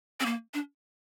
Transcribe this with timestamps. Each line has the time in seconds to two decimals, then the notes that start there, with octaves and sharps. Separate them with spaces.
0.20 C4
0.26 A#3
0.54 D4